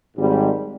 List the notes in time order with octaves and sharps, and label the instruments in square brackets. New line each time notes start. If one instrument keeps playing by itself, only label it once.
[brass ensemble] G#1 G#2 G3